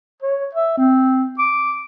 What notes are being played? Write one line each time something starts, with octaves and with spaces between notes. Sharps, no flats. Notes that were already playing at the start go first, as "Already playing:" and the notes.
C#5
E5
C4
D6